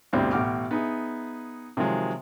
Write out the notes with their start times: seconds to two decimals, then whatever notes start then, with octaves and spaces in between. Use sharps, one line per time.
0.13 D2 G2 B2 G3 C4 E4
0.31 A1 B2 F#5 G5 D6 F6
0.71 B3 D#4 G#4 E5
1.77 C3 D#3 F3 F#3 G#3